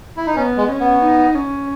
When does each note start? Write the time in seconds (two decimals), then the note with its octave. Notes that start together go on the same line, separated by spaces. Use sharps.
0.17 E4
0.26 D#4
0.35 B3 C#4
0.57 G#3
0.69 C#4
0.80 B3
1.02 D#4
1.35 C#4